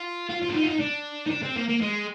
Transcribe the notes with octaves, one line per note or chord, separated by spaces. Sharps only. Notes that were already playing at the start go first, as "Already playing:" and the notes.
Already playing: F4
F4
F4
D4
D#4
F4
D#4
D4
D#4
D4
C4
A#3
A#3
G#3